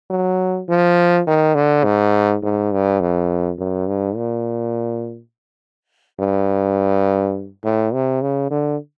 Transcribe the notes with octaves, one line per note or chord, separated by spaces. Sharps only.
F#3
F3
D#3
D3
G#2
G#2
G2
F2
F#2
G2
A#2
G2
A2
C3
C#3
D3